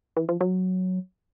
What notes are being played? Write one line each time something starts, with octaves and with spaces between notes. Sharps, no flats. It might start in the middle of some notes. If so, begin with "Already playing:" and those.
E3
F3
F#3